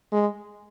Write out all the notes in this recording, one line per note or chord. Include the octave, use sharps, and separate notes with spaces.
G#3